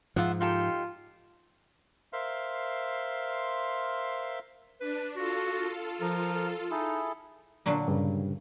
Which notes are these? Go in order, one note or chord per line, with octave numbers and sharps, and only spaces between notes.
G#2 F3 F4 E5 F#5
D#4 F4 G4 A4
A#4 C5 E5 F5 C6
D4 B4
F4 F#4 A4
F3 A#4 F6
D#4 E4 G#4 A4
A#2 D3 F#3
G2 C#3